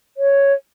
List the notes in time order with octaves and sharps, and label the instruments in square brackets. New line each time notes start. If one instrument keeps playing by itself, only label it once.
[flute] C#5